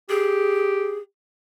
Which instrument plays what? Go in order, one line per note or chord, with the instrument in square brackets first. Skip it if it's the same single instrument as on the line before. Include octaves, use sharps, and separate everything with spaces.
[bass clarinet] G4 [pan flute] G#4